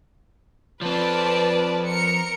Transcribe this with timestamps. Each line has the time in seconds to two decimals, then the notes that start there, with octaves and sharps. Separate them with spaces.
0.82 F3 C4 B4 D5 A5
1.87 A#4 C#7